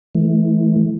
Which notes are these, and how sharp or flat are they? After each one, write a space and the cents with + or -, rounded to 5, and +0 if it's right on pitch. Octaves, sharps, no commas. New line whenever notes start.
E3 +0 A3 -25